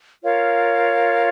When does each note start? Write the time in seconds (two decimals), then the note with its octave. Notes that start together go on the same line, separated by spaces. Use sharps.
0.24 F4 A#4 C#5 F5